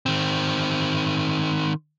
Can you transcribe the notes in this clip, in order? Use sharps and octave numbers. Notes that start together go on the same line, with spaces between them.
D#3 C4